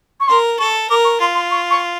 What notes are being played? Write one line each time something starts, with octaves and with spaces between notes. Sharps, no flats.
C#6
A#4 C6
A4 C#6
A#4 D6
C#6
F4 C6
C6
C#6
C#6